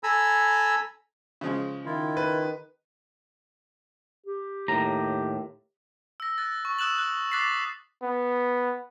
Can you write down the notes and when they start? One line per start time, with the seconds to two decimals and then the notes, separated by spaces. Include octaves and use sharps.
0.03 A4 G#5 A#5 B5 E6
1.41 C#3 F3 G#3
1.86 D#3 E4 F4
2.17 B4
4.26 G4
4.68 D#2 A2 A#5
6.20 E6 A#6
6.38 F#6 A6
6.65 C#6
6.79 D#6 E6 F#6 E7 F#7
6.99 F#6
7.31 D6 F#6 A6 B6 C7
8.03 B3